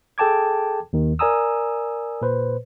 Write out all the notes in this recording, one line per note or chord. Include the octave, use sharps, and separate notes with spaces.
G#4 A4 G5 A5 D6 G#6
D#2 D#3
A#4 D5 G#5 A#5 D#6 E6
A#2 B4 C5